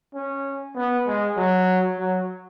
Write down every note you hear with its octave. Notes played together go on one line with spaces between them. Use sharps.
C#4
B3
G#3
F#3
F#3